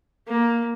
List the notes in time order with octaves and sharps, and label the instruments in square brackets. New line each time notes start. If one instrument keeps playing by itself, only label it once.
[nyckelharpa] A#3